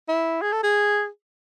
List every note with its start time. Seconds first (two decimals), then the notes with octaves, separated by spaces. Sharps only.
0.08 E4
0.42 G#4
0.52 A4
0.63 G#4